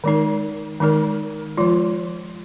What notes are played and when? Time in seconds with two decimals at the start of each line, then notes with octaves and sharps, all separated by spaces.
0.04 D#3 G#3 D#4 A#4
0.80 D#3 G#3 D#4 A#4
1.57 F3 G#3 F4